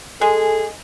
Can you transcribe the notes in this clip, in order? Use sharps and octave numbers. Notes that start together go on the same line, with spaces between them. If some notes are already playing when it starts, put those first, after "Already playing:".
G#3 G#4 A4